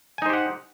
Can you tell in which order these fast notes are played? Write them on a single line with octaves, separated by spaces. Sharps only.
G#5 D#4 C5 G4 F#5